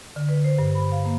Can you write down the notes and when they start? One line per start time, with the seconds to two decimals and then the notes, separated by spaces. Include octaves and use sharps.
0.16 D3
0.29 B4
0.44 C5
0.58 G2
0.75 B5
0.92 F5
1.05 A#3